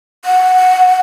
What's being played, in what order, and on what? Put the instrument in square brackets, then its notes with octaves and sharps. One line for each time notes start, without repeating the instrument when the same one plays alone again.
[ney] F#5